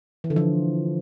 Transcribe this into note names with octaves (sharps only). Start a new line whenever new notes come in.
E3
D3
F3